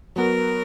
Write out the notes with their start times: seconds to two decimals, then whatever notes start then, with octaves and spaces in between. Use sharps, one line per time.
0.16 F#3 B3 F#4 A#4